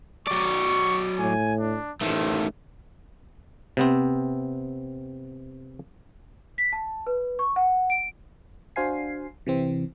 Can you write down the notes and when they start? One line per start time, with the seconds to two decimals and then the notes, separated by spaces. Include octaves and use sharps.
0.27 F#3 D5 C#6
1.19 A2 G#5
1.60 D4
2.02 A1 D#3 A3 C5
3.77 C3 B3 C4
6.58 B6
6.73 A5
7.07 B4
7.39 C#6
7.56 F#5
7.90 D7
8.76 D4 F#4 C5 F5 G#5 C7
9.47 C3 E3 C4